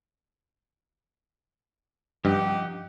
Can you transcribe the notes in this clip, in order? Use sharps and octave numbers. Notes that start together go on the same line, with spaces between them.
G2 F3 C#4 D#4 G4 D#5 F#5